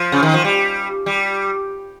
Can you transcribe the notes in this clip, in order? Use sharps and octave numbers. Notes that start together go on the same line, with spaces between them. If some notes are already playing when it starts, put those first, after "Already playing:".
Already playing: F3
C#3
D#3
F3
G3
G3